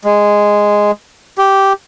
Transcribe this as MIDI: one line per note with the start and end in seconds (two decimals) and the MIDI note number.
0.04 0.91 56
1.38 1.73 67